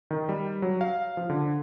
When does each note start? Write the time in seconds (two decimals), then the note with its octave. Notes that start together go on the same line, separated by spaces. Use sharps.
0.11 D#3
0.29 G3
0.62 F#3
0.81 F5
1.17 F3
1.30 D3